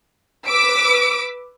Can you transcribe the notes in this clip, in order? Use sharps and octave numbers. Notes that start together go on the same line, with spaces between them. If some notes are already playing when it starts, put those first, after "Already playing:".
B4 D6 E6 B6 D7